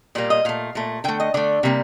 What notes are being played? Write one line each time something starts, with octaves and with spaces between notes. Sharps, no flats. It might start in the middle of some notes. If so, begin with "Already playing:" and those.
A#2 G3 A#3 D5
D#5
A#2 A3 F5
A#2 A3
D3 A3 G5
D#5
D3 A3 D5
C3 G3 A#3